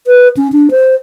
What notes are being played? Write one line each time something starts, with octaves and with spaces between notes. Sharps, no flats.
B4
C#4
D4
C5